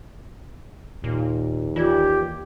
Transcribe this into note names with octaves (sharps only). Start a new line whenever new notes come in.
D#2 A#2
E3 F4 G4 D5 G#6